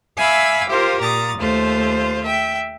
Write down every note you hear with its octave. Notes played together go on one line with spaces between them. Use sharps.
E5 F5 G#5 B5 D6 E6
F4 G4 A#4 C5
A#2 A#5 D#6 A6
D#2 A3 F4 C5
E5 G5